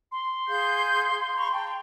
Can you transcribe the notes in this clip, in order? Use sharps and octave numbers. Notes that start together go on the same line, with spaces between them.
C6
G#4 F5 G6
A#5 B5 C#6
G5 A5 A#5